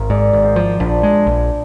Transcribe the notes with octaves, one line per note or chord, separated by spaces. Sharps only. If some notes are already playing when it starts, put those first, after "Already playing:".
Already playing: G#1 A#4
G#2 D5
G#1
C5
F3
A#1 D4
G#3
A#1